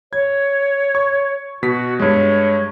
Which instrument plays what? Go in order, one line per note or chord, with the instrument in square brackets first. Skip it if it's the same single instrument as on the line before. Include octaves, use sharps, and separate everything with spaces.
[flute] C#5 [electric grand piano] G#6
[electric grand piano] C#6
[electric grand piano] B2 B6 [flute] F#4
[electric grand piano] G2 G#3 [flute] C#5